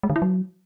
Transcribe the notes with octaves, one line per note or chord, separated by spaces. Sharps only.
G#3
D3
E4
F#3